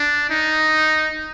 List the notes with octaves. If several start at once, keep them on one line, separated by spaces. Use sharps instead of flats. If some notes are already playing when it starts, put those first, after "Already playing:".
Already playing: D4
D#4